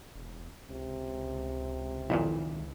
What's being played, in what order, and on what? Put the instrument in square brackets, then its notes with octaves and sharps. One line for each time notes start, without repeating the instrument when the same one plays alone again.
[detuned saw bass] E1
[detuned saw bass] C#2 [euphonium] C3
[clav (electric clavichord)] B1 F2 A#2 [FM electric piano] D#3 E4